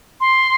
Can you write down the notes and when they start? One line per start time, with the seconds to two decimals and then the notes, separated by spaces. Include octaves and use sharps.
0.21 C6